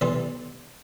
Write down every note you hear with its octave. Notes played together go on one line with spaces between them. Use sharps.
B1 E3 G3 A4 C6